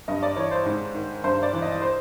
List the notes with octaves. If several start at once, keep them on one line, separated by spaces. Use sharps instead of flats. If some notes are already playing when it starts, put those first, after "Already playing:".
G2 D#5
D5
E3 C#5
C5
G#2
D#3
G2 C5
D5
E3
D#5
C5